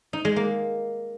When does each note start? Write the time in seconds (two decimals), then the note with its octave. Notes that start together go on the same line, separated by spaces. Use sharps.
0.13 D#4
0.25 G#3
0.36 A#3